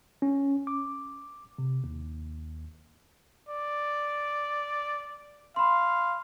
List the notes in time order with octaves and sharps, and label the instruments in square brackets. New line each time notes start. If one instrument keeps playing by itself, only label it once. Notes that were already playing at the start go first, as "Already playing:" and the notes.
[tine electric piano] C#4
D6
C3
D#2
[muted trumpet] D5
[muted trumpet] F5 [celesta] B5 C6